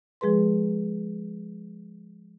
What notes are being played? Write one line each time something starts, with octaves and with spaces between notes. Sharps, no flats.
F3 G#3 G#4 B4 C6